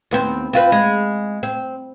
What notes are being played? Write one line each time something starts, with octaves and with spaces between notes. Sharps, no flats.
D#2 B3 C4
C4 F4 B4
G#3
C4